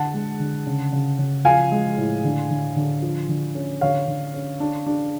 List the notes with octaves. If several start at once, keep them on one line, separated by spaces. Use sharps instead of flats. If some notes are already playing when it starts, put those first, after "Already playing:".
Already playing: D3 F#5 A5
G#3
D3
C#3
C#3
C#3
F3 F5 G#5
G#3
A2
D3
D3
D3
F3
D3
C#4
D3 C#5 F5
D3
C#4
D4
D4